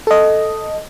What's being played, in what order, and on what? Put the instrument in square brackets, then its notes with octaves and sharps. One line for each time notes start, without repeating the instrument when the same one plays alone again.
[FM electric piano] A4 D#5